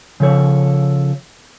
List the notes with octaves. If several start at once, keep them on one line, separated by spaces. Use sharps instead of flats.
C#3 F3 A4 C#5